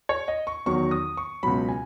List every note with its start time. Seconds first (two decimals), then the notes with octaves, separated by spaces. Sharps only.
0.09 C#5
0.28 D#5
0.47 C#6
0.66 E2 D#3 F#3 C#6
0.91 D#6
1.17 C#6
1.43 C#2 B2 F#3 B5
1.69 G#5